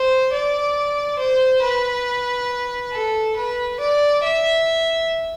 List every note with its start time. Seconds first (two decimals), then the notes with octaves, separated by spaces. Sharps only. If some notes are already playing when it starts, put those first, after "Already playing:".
Already playing: C5
0.32 D5
1.19 C5
1.62 B4
2.93 A4
3.37 B4
3.80 D5
4.23 E5